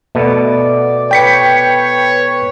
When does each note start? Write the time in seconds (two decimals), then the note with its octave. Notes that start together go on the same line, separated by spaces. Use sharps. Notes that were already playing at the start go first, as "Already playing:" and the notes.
0.15 B2 A3 B3 D5
1.11 B4 C#5 G5 B6 C#7